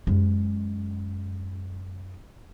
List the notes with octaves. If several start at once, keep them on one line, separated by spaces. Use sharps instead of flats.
F#2 G#3